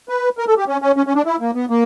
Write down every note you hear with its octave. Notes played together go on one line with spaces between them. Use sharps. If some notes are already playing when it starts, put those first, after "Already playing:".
B4
A#4
A4
G4
C#4
C#4
C#4
C#4
D4
E4
A#3
B3
A#3